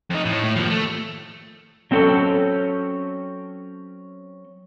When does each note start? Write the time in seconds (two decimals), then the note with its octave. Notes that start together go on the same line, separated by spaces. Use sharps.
0.10 F2 D#4
0.25 A2
0.44 A2
0.56 D#2 F3
0.70 A3
1.91 F#3 C4 C#4 A4